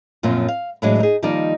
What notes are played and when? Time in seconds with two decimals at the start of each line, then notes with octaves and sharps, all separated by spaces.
0.23 F#2 A#2 F3 C4 C#4
0.48 F5
0.82 A2 E3 F#3 G#3 D4 G#4
1.00 D#4 G#4
1.22 D#3 F3 G3 A#3 D#4 D5